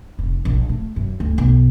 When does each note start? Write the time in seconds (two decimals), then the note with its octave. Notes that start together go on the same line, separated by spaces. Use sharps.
0.19 F1
0.45 A#1
0.69 A3
0.96 F#2
1.20 D2
1.38 B1